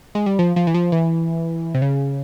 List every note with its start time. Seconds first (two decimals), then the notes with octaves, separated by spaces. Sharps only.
0.15 G#3
0.26 G3
0.39 F3
0.56 F3
0.67 E3
0.74 F3
0.92 E3
1.74 C3
1.82 C#3